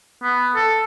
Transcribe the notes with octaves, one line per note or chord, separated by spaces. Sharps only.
B3
A4